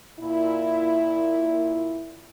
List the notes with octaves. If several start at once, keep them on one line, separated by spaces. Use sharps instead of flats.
A#2 E4